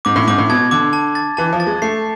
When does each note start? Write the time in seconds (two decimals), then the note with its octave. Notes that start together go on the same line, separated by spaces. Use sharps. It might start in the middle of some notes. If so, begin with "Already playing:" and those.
0.05 G#2 D6
0.16 A2
0.27 G#2 D6
0.38 A2
0.50 B2 G#6
0.71 D3 D6
0.93 A5
1.15 A6
1.37 E3 A5
1.53 F3
1.60 A6
1.67 G#3
1.82 A3 C7